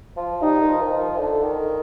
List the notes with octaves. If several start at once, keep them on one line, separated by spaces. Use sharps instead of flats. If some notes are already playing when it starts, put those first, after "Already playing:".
F3
G3 D#4
D#3
F3
D#3
F3
D3
D#3